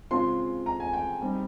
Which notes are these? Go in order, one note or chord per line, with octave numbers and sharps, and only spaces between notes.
C#3 G#3 C4 F4 C6
A#5
G#5
G5
G3 C4 D#4